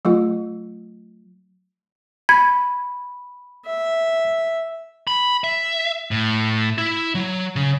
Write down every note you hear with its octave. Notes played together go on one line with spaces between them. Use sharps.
F#3 A3 F4
B5 G#6
E5
B5
E5
A2
E4
F#3
C#3